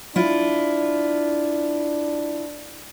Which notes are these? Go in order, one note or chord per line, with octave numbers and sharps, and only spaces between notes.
D4 E4 F4